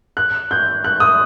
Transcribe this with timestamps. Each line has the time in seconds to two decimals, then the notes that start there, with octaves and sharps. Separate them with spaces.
0.17 F#6
0.51 G6
0.84 F#6
1.00 D#6